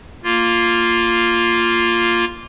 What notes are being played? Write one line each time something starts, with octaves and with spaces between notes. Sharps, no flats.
A#3 F4